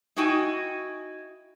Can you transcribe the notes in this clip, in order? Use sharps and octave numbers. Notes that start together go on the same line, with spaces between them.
D#4 E4 F#4 G5 G#5